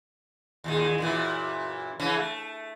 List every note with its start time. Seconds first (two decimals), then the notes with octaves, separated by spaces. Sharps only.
0.64 D#2 A#2 G#3
0.98 F#2 A#2 E3
2.00 C#3 E3 C#4
2.16 A3